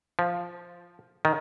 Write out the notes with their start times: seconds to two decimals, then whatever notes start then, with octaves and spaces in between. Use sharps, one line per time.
0.19 F3
1.25 D#3